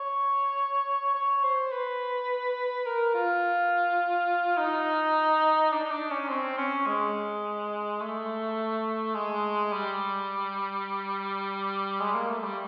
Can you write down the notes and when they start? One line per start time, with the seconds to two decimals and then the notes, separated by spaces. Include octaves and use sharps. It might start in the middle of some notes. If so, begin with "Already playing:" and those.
Already playing: C#5
1.15 C#5
1.43 C5
1.72 B4
2.86 A#4
3.14 F4
4.58 D#4
5.72 D4
5.83 D#4
5.91 D4
6.10 C#4
6.29 C4
6.58 C#4
6.86 G#3
8.00 A3
9.14 G#3
9.72 G3
12.01 G#3
12.15 A#3
12.30 A3
12.44 G3